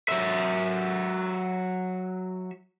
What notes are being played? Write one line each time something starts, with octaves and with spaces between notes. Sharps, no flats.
F#3 E5